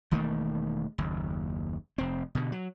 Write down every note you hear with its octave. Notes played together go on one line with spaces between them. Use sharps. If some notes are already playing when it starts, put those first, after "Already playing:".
E1 D#3 A3 A#3
F#1 D#2
F1 C4
B2 D3
F#3